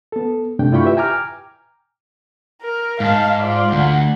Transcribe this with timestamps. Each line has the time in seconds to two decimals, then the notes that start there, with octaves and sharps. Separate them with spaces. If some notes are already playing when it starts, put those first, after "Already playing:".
0.12 B3 A4
0.59 G2 C3 A3 D4 G5
0.72 E4 F4 D5 G5 B5 C#6
0.84 G4 B4 E5
0.97 G5 G#5 A#5 D6 F6
2.62 A#4
3.00 G#2 F5 A5
3.41 F4 D5
3.72 D2 F#5